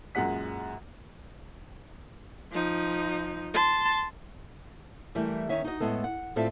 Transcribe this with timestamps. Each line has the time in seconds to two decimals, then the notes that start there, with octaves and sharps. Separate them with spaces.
0.15 F#2 A#2 G#3 F#5 B6
2.52 F3 D#4
3.54 A5 C6
5.15 E3 G3 A3 G4 A#4
5.49 D#3 C#4 E5
5.64 D#4 F#4 D#5
5.80 A2 G#3 B3 A4
6.04 F#5
6.36 A2 C4 F4 A4 D5 E5